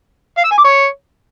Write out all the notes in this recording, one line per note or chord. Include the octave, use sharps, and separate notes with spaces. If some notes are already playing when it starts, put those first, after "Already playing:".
F5
E6
G#5
D6
C#5